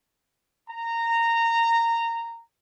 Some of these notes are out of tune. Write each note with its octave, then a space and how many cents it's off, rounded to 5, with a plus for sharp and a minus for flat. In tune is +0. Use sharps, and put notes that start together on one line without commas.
A#5 -15